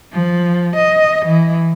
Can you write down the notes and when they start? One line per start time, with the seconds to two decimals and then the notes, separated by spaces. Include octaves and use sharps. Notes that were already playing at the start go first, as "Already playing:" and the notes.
0.13 F3
0.77 D#5
1.26 E3